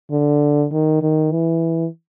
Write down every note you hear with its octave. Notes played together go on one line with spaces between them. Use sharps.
D3
D#3
D#3
E3